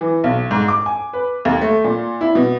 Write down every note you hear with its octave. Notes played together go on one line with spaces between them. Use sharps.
E3
B1
G#2
D6
G#5
B4
D#2
A3
A#2
E4
B2